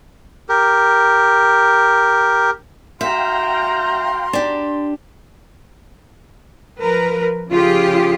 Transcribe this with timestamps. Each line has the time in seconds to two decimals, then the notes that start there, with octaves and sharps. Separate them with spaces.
0.49 G4 A#4
3.01 F#4 E5 F5 G5 A#5 C6
4.33 D4 G4
6.80 F3 A#4 B4
7.48 C#3 F3 F4 G4 G#4